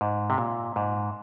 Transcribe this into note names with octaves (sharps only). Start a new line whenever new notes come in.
G#2
C3
A#2
G#2